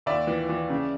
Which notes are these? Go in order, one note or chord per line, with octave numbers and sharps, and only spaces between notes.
D#2 D5 E5
E3
E3
C#3